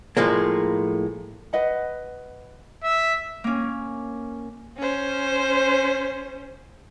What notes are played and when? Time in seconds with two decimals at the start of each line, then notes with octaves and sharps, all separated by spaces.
0.17 A2 F3 G#3 A#3
1.53 B4 D#5 F#5
2.83 E5
3.44 A#3 C#4
4.78 C#4 C5